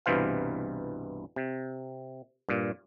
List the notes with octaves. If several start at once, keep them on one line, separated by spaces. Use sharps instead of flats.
C2 G2 B2 E3 C5 F5
C3
G2 A#2